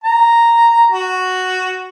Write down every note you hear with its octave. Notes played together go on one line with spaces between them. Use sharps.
A#5
F#4